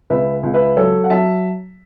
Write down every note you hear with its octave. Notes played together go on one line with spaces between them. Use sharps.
C#2 B4 E5
C#2
B4 E5
F#3 A4 C#5
F#5
F#3 E5 A5